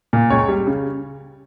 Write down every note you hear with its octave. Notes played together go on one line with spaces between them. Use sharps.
A#2
C#2 C#5
G3
C#3